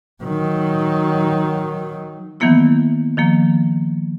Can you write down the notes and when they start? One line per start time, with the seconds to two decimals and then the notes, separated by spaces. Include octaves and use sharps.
0.23 D#3 F#3
2.40 D#3 E3 F#3 A#3 B3 E4
3.17 D#3 F3 A#3